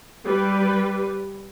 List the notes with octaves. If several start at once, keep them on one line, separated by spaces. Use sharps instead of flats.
G3 B4